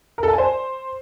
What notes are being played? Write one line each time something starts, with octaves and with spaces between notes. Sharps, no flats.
A#4
A4
A5
G#5
C5